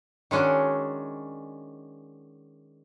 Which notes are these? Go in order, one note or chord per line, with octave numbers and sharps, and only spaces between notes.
D#3 G#3 C#4 D4 F#4